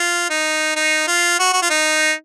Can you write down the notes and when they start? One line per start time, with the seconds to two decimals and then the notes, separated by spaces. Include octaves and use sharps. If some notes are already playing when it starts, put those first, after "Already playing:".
Already playing: F4
0.30 D#4
0.76 D#4
1.08 F4
1.39 F#4
1.53 F#4
1.62 F4
1.70 D#4